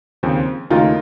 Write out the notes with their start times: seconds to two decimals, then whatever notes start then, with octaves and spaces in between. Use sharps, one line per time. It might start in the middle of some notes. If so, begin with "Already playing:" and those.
0.23 D#2 C#3 F3 C4
0.70 D#2 C#3 A3 D#4 F4 A#4